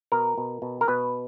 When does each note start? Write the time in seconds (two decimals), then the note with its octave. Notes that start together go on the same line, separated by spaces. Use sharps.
0.12 B2 A#4
0.38 B2
0.62 B2
0.81 A#4
0.88 B2 B4